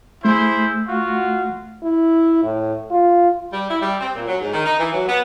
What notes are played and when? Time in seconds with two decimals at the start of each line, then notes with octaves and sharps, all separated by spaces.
0.25 A3 E4 G#4 C5
0.88 F4 F#4
1.83 E4
2.43 A2
2.91 F4
3.52 G3
3.69 E4
3.81 G3
4.00 C4
4.15 A#2
4.28 F#3
4.41 G#2
4.53 D#3
4.66 D#4
4.79 E3
4.92 F#3
5.07 B3